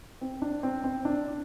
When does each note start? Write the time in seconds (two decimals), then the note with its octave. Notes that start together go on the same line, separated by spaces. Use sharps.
0.21 C4
0.42 D4
0.63 C4
0.84 C4
1.05 D4